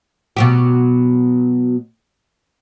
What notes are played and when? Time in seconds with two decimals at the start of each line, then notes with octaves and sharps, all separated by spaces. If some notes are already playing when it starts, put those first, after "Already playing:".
0.37 B2 F#3 G4